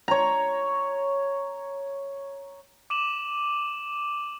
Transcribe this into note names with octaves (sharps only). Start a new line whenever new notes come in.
C#5 A#5
D6 D#7 E7 F#7